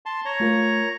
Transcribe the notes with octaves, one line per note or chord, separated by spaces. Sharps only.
A5 C6
C#5 A#5
A3 F4 A#4